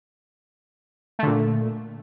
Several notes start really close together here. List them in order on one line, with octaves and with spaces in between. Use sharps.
A3 D3 A#2